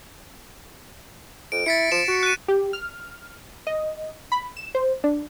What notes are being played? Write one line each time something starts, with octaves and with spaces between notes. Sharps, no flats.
F2 D7
E4 A6 B6 C#7
F3 E7
F#4
F#6 D#7
G4
F6
D#5
B5
E7
C5
D4